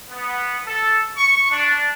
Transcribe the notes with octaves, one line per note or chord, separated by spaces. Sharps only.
B3
A4
C#6
D4